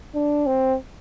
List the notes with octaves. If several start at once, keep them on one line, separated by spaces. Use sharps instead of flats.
D4
C4